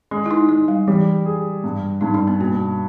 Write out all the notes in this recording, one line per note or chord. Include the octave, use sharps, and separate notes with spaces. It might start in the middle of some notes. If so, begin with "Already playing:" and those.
G#3 C#4
E4
D#4
G#3 D#4
G3
E3 G3
G#4
G2
G2 D#4
C#4
B3
B2 A#3